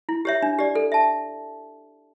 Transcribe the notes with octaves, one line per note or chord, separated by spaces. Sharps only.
E4
G4 C#5 E5
D4
G4 D5
A4
E5 A5